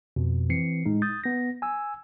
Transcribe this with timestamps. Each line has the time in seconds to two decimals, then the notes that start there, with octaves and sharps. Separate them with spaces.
0.16 F2 B2
0.50 E3 C4 C7 C#7
0.86 A2 G#3 D#4
1.02 D#6 G6 A6
1.24 B3 A#6
1.62 G#5 E6